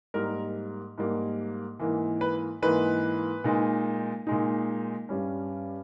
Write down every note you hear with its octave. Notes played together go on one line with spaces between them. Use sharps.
G#2 G3 A#3 A#4
G#2 G3 A#3
G#2 E3 A#3
B4
G#2 E3 A#3 B4
A#2 G#3 D#4
A#2 G#3 D#4
G2 G3 C#4